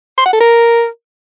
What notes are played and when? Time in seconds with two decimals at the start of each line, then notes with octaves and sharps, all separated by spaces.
0.18 C6
0.26 F#5
0.33 A4
0.41 A#4